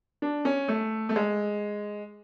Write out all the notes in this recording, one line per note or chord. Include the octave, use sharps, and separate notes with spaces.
D4
C#4
A3
A3
G#3